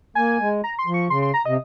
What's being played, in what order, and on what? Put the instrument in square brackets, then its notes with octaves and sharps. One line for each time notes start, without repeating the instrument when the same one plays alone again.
[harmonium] A#3 [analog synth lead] G#5
[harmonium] G#3
[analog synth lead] A#5
C6
[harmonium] F3
[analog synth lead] C#6
[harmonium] C#3 [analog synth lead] C6
[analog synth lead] C6
A#5
[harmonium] C3 [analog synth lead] D#5